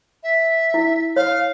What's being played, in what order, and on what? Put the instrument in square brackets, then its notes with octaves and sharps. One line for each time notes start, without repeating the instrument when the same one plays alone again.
[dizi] E5
[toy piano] E4
[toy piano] C#5 [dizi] F5